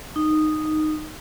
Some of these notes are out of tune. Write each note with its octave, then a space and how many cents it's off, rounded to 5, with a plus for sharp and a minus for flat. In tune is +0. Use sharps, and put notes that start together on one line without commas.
D#4 -10